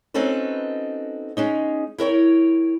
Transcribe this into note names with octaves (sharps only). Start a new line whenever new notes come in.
C4 C#4 D#4 F#4 A4 B4
G#3 C#4 D#4
E4 A#4 C#5 G5